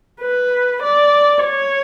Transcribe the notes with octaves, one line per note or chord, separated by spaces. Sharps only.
B4
D5
C#5